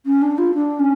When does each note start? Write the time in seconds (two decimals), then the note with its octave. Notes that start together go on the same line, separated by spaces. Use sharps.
0.06 C#4
0.21 D4
0.38 F4
0.54 D4
0.79 C#4